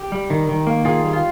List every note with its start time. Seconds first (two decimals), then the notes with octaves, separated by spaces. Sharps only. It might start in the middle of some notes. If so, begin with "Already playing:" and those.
Already playing: G4
0.12 G3
0.30 D#3
0.49 D#3
0.67 A#3
0.85 D#3 F4 G#4
1.04 G3
1.13 F4